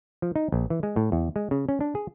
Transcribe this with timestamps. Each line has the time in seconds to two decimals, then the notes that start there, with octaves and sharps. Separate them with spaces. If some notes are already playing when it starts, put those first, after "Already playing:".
0.22 F3
0.36 D#4
0.52 A#1
0.70 E3
0.83 G#3
0.96 A2
1.12 E2
1.36 G#3
1.51 C#3
1.69 C#4
1.81 D4
1.95 G#4